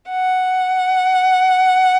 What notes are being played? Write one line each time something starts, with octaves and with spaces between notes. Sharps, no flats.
F#5